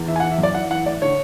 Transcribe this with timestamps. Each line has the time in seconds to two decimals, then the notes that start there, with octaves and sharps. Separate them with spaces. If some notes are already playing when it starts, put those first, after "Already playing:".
Already playing: E2
0.08 E3 E5
0.16 G#5
0.20 F#5
0.23 E3
0.31 E5
0.38 F#2
0.43 D5
0.54 E3 F#5
0.70 E3 F#5
0.85 A2 D5
1.02 D3 C#5